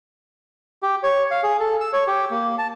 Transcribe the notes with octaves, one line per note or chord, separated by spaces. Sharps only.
G4
C#5
F5
G#4
A4
E6
C#5
G4
A#3
A5